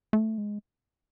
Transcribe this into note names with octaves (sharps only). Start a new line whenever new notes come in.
A3
G#3